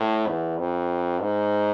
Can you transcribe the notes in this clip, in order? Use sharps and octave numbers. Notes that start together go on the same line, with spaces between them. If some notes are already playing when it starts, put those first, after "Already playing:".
Already playing: A2
E2
F2
G#2